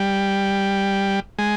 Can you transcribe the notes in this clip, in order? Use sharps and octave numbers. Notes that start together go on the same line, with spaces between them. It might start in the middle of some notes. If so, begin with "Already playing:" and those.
Already playing: G3
G#3